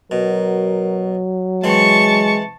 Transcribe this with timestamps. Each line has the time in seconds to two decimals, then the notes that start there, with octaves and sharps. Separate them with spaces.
0.11 B2 F#3 A#4
1.64 E3 G#3 C4 E4 A5 C#6